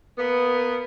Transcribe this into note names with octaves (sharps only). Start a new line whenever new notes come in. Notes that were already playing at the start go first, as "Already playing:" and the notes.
A#3 B3